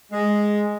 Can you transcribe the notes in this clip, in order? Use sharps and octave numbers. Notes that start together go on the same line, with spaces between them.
G#3